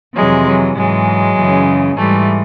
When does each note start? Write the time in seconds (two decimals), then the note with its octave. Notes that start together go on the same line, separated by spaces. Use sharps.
0.15 F2 C3 E3 F#3 G#3
0.47 F#3
0.76 G#2 E3 F#3 G#3
1.37 F#2 C#3 E3
1.97 G#2 E3 G3 A3